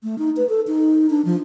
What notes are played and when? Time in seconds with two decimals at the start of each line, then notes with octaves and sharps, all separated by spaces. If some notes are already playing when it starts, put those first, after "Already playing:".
0.03 A3
0.18 D#4
0.37 B4
0.49 A4
0.67 D#4
1.10 D4
1.25 F3